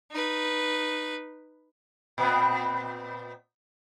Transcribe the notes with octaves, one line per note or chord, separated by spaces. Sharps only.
D#4 B4
A#2 B3 C4